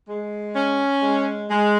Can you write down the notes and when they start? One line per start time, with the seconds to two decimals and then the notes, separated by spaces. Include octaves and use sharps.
0.09 G#3
0.56 C#4
1.03 G#3
1.50 G#3